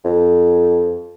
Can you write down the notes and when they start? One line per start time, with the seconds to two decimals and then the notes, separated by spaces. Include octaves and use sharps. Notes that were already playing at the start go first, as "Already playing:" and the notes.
0.04 F2